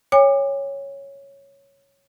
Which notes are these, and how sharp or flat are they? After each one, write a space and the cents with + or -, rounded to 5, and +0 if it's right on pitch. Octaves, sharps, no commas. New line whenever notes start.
C#5 +0 G#5 -45 D6 +30